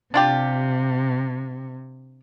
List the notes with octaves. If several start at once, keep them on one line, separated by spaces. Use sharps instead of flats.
C3 D4 F4 G4